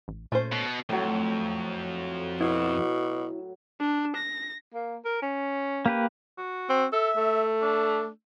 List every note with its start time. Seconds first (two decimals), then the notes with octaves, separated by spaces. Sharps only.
0.08 A1
0.32 A#2 A3 C#4 C5
0.52 B2
0.89 F2 A2 F#3
2.41 B2 E4
3.80 D4
4.16 A#6
4.74 A#3
5.05 A#4
5.22 C#4
5.86 A#3 G4 B4
6.38 F#4
6.69 C4
6.93 A4 E5
7.17 A3
7.62 D4